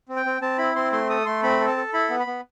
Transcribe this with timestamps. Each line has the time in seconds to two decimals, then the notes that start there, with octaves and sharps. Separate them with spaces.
0.09 C4
0.16 G5
0.26 C4
0.41 C4 A5
0.58 E4 B5
0.76 C4 C6
0.92 A3 C6
1.10 A4 D#6
1.26 A3 C6
1.43 C4 B5
1.61 A4
1.68 A5
1.76 A4
1.93 E4 B5
2.10 B3
2.20 B5
2.27 B3